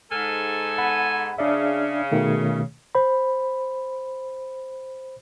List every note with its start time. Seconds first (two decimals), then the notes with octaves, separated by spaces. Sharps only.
0.12 G#2 A4 G#5 F6
0.78 F#5 B5
1.38 C#3 D4 D5 E5
2.12 B2 D#3 A3
2.95 C5 B5